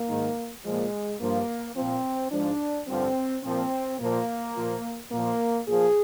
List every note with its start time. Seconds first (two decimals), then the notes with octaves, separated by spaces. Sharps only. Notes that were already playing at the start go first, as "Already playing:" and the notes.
Already playing: A#3
0.08 G#2 D#3
0.64 A#2 F3 G#3
1.20 G2 F3 A#3
1.76 A#2 F3 C4
2.32 G#2 F3 D4
2.88 G2 D3 F3 C4
3.44 A#2 F3 C4
4.00 A#2 F3 A#3
4.56 A#2 F3
5.11 A#2 F3 A#3
5.67 A#2 F3 G#4